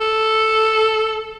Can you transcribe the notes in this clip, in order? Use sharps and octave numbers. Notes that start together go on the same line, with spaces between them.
A4